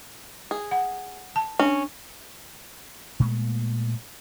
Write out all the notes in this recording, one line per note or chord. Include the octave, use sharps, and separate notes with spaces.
G#4
F#5
A5
C#4 D4
A#2 G#3 A3